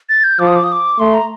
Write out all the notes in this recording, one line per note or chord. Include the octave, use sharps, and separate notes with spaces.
A6
G6
F3 D6
D#6
D6
D#6
D6
A3 C6
A#5